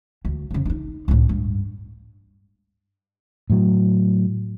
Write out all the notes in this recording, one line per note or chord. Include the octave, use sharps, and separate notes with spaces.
D2
F2 C#3
D4 D#4
C#2 A2
G2
A2 F#3